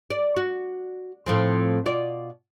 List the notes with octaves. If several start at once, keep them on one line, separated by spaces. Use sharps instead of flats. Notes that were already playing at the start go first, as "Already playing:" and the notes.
D5
F#4
A2 F3 C4
B2 F4 D5